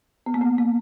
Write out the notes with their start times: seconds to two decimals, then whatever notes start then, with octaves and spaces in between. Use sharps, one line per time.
0.26 B3
0.34 A#3
0.41 B3
0.58 A#3